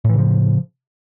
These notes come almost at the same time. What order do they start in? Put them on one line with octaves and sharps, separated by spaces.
A2 E3 C#3 F3